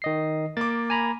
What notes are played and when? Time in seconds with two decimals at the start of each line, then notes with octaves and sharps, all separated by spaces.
0.02 D#3 D#5 C7
0.57 A#3 D6 A6
0.90 G#5 A#5 B5